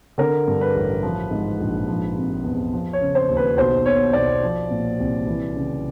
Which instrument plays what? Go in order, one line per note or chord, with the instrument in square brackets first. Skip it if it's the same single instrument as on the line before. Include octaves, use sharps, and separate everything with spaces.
[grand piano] D3 A#4
G2
B4
A1
F3
G#2
A#1
F3
C3
E2
F3
C#5
C#3
C5
D#2
B4
B1 C5
B2 C#5
B1 D5
F3
A#2
C2
E3
C#3